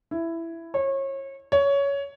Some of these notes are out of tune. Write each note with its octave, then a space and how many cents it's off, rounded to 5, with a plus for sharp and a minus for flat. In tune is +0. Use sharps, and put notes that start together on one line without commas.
E4 +10
C#5 -30
C#5 +15